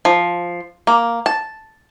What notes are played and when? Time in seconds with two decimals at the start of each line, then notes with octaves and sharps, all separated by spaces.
0.05 F3
0.87 A#3
1.26 A5